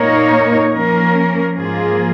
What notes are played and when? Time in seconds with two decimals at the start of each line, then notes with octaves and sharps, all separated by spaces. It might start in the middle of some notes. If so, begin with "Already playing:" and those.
Already playing: A#2 A#3 D#4 A#4 C#5
0.74 F3 A#3 C#4 A#4
1.57 G#2 F3 A#3 F4 G#4